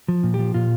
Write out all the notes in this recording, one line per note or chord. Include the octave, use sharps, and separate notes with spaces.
F3
A#2
G4
F3
A#2 F4